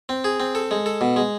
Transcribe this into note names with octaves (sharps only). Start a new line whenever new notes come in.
C4
G#4
C4
A4
G#3
A4
B2
G#3